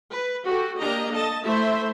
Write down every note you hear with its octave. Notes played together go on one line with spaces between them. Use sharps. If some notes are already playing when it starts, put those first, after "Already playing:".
B4
F#4 G4 A4
A#3 D4 G4 D#5 A#5
A4 D#5 A5
A3 E4 C5 E5